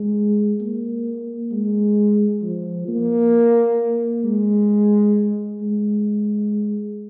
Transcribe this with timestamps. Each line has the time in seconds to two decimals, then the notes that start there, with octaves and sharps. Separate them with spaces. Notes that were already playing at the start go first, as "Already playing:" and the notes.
Already playing: G#3
0.60 A#3
1.52 G#3
2.42 F3
2.88 A#3
4.24 G#3
5.61 G#3